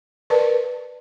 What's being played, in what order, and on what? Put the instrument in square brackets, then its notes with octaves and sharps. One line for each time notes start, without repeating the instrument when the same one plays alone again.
[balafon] A#4 B4 D5 A5